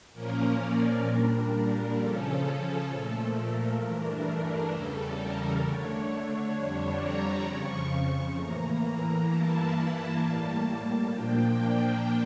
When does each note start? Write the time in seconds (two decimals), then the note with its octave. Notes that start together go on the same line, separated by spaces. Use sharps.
0.13 A#2 F3 A#3 C#4 A#4
0.59 D5
1.05 A#2 G3 D4 A#4
1.96 C#3 F3 C#4 A4
2.42 A4
2.87 A#2 F3 A3
3.33 A#4
3.79 G2 E3 A3 D4
4.70 E2 C#3 G3 A4
5.16 A#4
5.62 D3 A3 D4 C#5
6.53 F2 D3 G3 D4
6.99 A#5
7.45 F2 C#3 F3 C#6
7.91 C#6
8.36 A2 E3 A#3 A#5
9.27 G2 E3 A#3 E4 A5
10.19 A2 G3 A#3
10.64 A5
11.11 A#2 F3 A#3 D4 G5